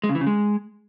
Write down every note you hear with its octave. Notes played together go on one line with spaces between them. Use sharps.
G#3
C#3
E3
C#3
G#3